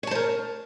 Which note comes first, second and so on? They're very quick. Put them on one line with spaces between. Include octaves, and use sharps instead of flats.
C#5 A5 C5 A#4